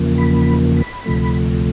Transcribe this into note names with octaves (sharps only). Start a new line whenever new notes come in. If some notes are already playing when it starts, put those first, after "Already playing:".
Already playing: E2 C#3 F3 A#3
B5
B5
D2 C3 F3 A3